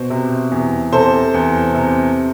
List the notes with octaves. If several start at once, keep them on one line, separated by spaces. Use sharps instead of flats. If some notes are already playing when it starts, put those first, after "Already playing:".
Already playing: B2 C5
C3
E2
C3 A4 C5
E2
C3